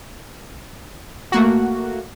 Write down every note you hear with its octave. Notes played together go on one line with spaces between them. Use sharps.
A3 A#3 F#4